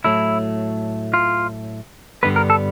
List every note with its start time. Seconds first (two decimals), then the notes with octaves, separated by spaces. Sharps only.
0.04 A2 F#3 A3 E4
1.14 F4
2.23 G2 D3 G3 B3 B4
2.36 A#4
2.50 A4